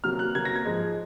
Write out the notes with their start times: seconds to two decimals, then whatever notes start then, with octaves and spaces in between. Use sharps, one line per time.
0.04 C3 F#3 A#3 F6
0.19 F#6
0.35 C3 F#3 A#3 G#6
0.45 A#6
0.55 G#6
0.65 G#2 F3 G#3